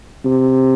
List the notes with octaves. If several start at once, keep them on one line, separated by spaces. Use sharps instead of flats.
C3